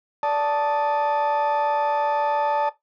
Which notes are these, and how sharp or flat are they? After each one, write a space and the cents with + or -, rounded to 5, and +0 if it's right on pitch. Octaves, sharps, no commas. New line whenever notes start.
D5 -15 A5 +0 D#6 +0